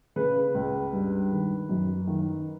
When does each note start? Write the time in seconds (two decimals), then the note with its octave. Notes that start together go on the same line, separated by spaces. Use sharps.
0.16 C#3 B4
0.55 C#2
0.93 G2
1.31 D#3
1.69 F#2
2.07 D#3